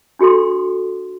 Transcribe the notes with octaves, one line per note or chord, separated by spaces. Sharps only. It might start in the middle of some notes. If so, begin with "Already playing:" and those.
D4 F#4 G4 A4 C6